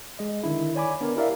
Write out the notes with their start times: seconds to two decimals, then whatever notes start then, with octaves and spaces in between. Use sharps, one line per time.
0.19 G#3 D#5
0.43 D3 D#3 D4 E4
0.75 C#5 D5 G#5 B5 D6
1.01 B3 D4 A#4
1.16 E4 G4 A#4 D5 E5 F5